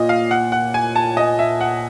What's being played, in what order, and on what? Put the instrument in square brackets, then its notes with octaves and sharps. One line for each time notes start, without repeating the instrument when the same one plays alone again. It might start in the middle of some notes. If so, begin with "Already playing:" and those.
Already playing: [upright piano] A#2 [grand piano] D#5
[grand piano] F5
F#5
F#5
G#5
A5
D#5
E5
F#5